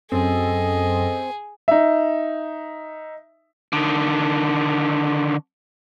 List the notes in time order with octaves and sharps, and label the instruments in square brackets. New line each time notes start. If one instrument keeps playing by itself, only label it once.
[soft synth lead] F#2 [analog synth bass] C4 [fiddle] G#4 [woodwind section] A4 D#5
[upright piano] D#4 E5
[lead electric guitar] D3 D#3